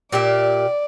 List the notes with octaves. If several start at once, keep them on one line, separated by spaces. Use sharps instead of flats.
A#2 G4 D5 E5